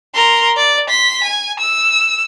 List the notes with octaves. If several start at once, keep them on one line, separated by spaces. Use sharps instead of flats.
A#4 C6
D5
C6 B6
G#5
E6